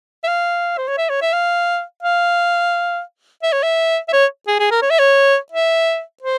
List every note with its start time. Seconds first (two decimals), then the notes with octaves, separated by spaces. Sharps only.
0.24 E5
0.28 F5
0.78 C5
0.88 C#5
0.98 E5
1.09 C#5
1.22 E5
1.33 F5
2.02 F5
3.43 E5
3.52 C#5
3.63 E5
4.08 E5
4.13 C#5
4.48 G#4
4.59 G#4
4.71 A#4
4.82 C#5
4.90 E5
4.99 C#5
5.52 E5
6.22 C5